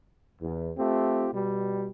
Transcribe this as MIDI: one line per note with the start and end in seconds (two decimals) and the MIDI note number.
0.41 0.72 40
0.78 1.30 57
0.78 1.30 60
0.78 1.30 65
0.78 1.30 67
1.34 1.88 47
1.34 1.88 55